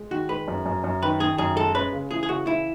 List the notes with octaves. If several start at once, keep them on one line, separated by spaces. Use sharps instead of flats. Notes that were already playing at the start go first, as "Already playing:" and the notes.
Already playing: G#3
D#3 F#4
G#3 B4
F#2
F#2
F#2
D#3 B4
D#3 G#4
F#2 G#4
G#3 A4
C#4 B4
C#3
E3 G#4
G#4
C#3 F#4
E3 E4